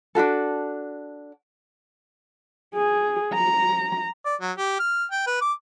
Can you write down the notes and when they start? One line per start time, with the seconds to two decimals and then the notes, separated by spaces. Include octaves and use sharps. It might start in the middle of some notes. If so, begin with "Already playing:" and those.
0.15 D4 F4 F#4 A4
2.75 G#4
3.34 A#5
4.26 D5
4.41 F#3
4.58 G4
4.79 F6
5.11 G5
5.27 B4
5.41 D6